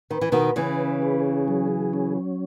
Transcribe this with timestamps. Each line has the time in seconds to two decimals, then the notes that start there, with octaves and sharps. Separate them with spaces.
0.10 D#3 B4
0.21 E3
0.32 B2 D#3
0.56 C#3 E3 C#4
1.02 G#4
1.48 F#3
1.93 C#4